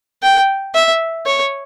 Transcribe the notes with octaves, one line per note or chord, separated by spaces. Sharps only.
G5
E5
C#5